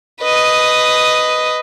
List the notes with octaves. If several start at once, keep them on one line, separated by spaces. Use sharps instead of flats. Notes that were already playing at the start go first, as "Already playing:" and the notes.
B4 D#5